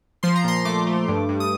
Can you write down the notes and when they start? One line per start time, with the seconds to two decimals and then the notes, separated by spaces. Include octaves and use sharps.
0.23 F3 C6
0.36 A#5
0.44 A#2 C6
0.65 A3 D6
0.87 A3
1.08 G2
1.29 G2
1.40 D#6